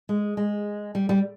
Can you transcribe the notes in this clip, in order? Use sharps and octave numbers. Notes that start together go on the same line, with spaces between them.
G#3
G#3
G3
G3